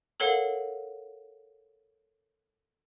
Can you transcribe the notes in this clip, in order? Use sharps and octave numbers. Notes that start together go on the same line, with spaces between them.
A4 A#4 C#5 F5 F#5